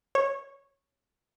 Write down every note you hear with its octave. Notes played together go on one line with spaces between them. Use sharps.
C#5